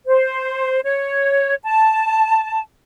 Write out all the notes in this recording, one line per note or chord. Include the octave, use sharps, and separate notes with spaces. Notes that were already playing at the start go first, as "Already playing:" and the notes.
C5
C#5
A5